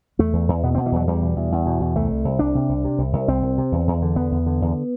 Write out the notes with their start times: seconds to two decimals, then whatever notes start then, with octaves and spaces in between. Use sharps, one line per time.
0.19 E2 A3
0.33 E2
0.49 E2
0.63 B2 B3
0.75 C4
0.77 B2
0.86 E3
0.92 E2 F#3
1.07 E2 G3
1.23 B2
1.36 E2
1.52 E2
1.66 B2
1.80 E2
1.95 C2 A3
2.11 C2
2.25 C2
2.39 C2 D4
2.55 C3
2.69 C2
2.85 C3
2.98 C2
3.13 C2
3.28 C2 C4
3.42 C2
3.58 C3
3.72 E2
3.88 E2
4.02 D3
4.16 E2 B3
4.32 E2
4.46 D3
4.61 E2